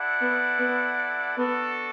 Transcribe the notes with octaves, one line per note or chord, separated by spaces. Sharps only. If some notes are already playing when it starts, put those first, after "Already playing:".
Already playing: E4 A4 D5 F#5
B3
B3
B3 D4 F#4 A4